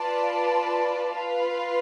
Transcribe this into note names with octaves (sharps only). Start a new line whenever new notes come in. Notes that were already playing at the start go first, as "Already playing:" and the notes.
Already playing: F4 B4 D5 A5
F4 B4 F5